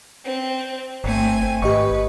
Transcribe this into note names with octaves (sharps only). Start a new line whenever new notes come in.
C4
G1 A3 C4 G#5
G#1 G4 B4 D#5 C#6